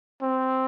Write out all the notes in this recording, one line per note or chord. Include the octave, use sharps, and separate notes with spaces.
C4